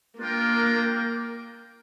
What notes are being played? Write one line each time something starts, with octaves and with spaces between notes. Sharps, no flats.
A#3 D4 F4 A#4 G5